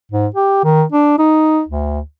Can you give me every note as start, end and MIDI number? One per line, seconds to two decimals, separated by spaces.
0.12 0.27 44
0.35 0.63 67
0.64 0.84 51
0.92 1.17 62
1.19 1.62 63
1.68 2.00 38